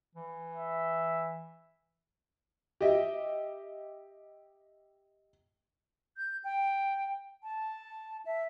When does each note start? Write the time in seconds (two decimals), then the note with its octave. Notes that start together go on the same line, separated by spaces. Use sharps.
0.15 E3
0.55 E5
2.81 G4 D#5 E5
6.17 G6
6.44 G5
7.43 A5
8.26 E5